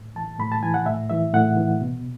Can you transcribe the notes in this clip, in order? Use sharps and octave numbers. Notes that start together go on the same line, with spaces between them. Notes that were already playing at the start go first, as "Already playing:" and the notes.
Already playing: A2
E3 A5
A2 B5
A5
E3 G#5
F#5
A2 E5
E3 E5
A2 F#5
E3
B2